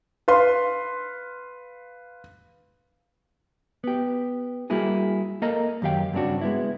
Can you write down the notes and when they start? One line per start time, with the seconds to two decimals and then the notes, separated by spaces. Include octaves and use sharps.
0.28 B4 F5 C6
3.84 B3 G4
4.70 G3 A#3 E4 F#4 G#4
5.42 A#3 A4 A#4 D#5 A#5
5.82 F#2 D#3 G4 F5 G5
6.13 G2 C#3 C4 D4 F#4
6.41 G#3 B3 E4